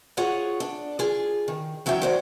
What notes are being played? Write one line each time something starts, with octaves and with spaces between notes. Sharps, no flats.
F4 G#4 C#5 F#5
D4
F4 G#4
D#3
E3 F#3 C#4 E5 G5
F#3 C5 D5